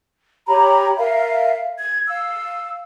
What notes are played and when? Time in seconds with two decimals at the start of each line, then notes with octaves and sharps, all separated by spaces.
0.47 G4 C#5 A#5 B5
0.98 A#4 E5 F5
1.78 G#6
2.07 F5 E6